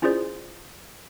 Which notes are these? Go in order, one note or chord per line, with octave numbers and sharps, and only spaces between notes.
C#4 E4 F4 G#4 C5 D5